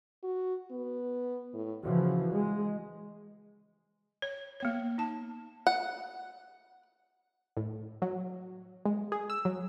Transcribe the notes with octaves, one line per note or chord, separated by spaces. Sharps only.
F#4
B3
A2
C#3 E3 F3 F#4
G#3
C#5
A#3 B3 C#5
D#4 A5
F#5
A2
F#3
G#3
G#4
E6
F#3